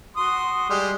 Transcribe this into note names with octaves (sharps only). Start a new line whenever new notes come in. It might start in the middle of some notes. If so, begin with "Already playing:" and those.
F#4 C6 D#6
G3 G#3